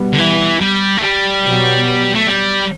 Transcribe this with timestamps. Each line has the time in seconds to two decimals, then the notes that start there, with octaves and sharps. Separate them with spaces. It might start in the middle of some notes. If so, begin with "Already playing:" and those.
Already playing: B2 G3 B3
0.13 D3
0.18 E3
0.61 G3
0.98 A3
1.01 G3
1.43 B2 F#3 B3
2.15 A3
2.26 G3